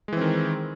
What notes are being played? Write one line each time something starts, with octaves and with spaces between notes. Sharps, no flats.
D#3 E3 G#3 C4